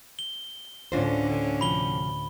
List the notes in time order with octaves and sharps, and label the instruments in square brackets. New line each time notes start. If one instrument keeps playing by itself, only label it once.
[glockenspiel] G7
[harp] D2 A2 [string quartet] D3 C#4 [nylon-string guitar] D4 F4 C5
[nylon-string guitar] C3 F3 [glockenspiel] B5 G7